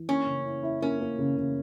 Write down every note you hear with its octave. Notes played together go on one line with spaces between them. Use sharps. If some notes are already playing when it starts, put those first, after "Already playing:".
Already playing: E3
A#3 C#4
C#3
E4
E4
A#3 C#4
A#3
C#3
C#3